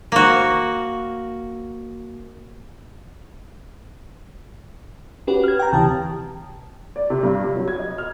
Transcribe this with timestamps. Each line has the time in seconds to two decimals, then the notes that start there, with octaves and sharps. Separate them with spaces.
0.12 A#3 F#4
5.27 C#4 F#4 G4 B4
5.44 F6 G#6
5.59 G5 A#5
5.72 D2 C3 E3 G4 A5
6.96 D5
7.10 C3
7.23 G2
7.43 C3
7.56 F#3
7.68 G#6
7.79 D#5
7.98 F6